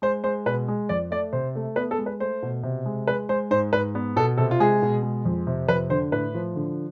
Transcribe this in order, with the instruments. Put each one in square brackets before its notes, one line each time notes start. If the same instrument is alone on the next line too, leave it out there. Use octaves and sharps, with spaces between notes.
[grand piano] G#3 C5
G#3 C5
B2 B4
G#3
F2 D5
A3 D5
C3 C5
A3
B3 B4
A4
G#3
B4
A3 C5
B2
C3
G#3
G#3 B4
G#3 C5
G#2 C5
G#2 B4
B3
B2 A4
C3 A4
F4
G#3 G#4
B2
G#3
F2
C3
F2 B4
D3 C5
A2 B4
F3
D3